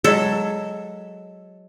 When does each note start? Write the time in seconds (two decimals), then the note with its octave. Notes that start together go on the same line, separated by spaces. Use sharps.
0.04 F#3 G#3 A4 E5